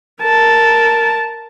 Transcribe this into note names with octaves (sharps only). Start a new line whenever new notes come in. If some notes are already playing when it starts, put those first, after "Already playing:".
A#4 A5